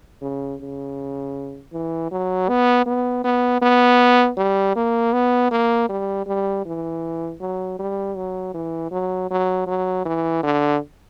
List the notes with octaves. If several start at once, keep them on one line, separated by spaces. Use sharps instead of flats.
C#3
C#3
E3
F#3
B3
B3
B3
B3
G3
A#3
B3
A#3
G3
G3
E3
F#3
G3
F#3
E3
F#3
F#3
F#3
E3
D3